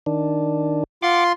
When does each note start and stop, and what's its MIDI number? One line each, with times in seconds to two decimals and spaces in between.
0.06 0.84 51
0.06 0.84 62
1.02 1.32 65
1.02 1.24 78
1.02 1.32 84
1.02 1.24 86